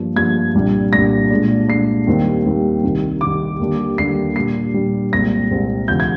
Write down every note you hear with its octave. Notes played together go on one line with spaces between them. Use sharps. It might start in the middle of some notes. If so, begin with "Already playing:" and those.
Already playing: G2 F3 A#3 D4
G2 F3 A#3 D4 G#6
C2 A#2 G3 D4
C2 A#2 G3 D4 A#6
A#2 G#3 D4
A#2 G#3 D4 C7
D#2 D#3 G3 C4
D#2 D#3 G3 C4
C2 C3 D#3
C2 C3 D#3 D6
D#2 D3 G3 D4
D#2 D3 G3 D4 C7
A#2 G3 D4 C7
A#2 G3 D4
C2 A#2 G#3 C4 A#6
C2 A#2 G#3 C4
D2 C3 F3 G6
G#6